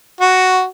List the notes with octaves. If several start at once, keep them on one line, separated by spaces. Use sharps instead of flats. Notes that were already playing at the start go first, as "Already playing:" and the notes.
F#4